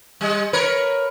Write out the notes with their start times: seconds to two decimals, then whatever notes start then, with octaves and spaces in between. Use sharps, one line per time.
0.21 G3 G#3
0.53 A#4 B4 C#5